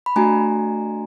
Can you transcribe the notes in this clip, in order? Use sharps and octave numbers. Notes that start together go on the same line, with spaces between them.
B5
A3 D4 F#4 G#5 A#5